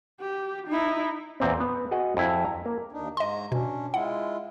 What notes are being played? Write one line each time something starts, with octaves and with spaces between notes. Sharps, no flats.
G4
D#4 E4
E2 A#2 C4
B3
F#4 G#4 D#5 F#5
F2 E4 G#5
A#5
A#3
D#2 D4 D#4
G#2 D#5 A#5 C6
B2 C#4 D4
G#3 E4 F4 F#5